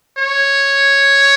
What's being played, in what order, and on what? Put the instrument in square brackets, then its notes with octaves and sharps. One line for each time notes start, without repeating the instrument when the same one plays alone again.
[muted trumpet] C#5